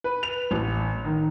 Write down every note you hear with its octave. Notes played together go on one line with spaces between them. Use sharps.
B4
F7
A1
D#3